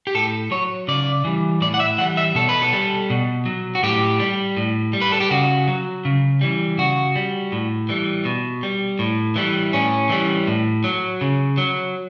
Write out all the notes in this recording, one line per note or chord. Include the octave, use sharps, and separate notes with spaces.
G4
A2 A4
F#3 C#5
C#3 D5
E3 G3
A2 D5
F#5
E5
E3 G3 F#5
E5
B2 A4
B4
A4
G3
B2
F#3
F#4
A2 G4
G3
A2
G3
B4
A4
G4
C#3 F#4
F#3
C#3
E3 G3
C#3 F#4
G3
A2
E3 G3
B2
G3
A2
E3 G3
A2 C#4
E3 G3
A2
F#3
C#3
F#3